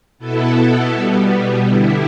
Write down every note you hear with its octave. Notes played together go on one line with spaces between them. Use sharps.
B2 B3 E4 A4
B2 G3 B3
D3 G3 E4